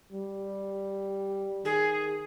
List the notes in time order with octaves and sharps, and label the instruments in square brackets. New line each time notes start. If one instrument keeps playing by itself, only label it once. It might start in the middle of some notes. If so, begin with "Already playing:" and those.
[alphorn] G3
[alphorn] D#3 [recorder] G#4